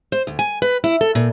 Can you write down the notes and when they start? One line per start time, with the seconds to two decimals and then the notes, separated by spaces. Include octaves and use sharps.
0.12 C5
0.27 D2
0.39 G#5
0.62 B4
0.84 E4
1.01 A4
1.15 A#2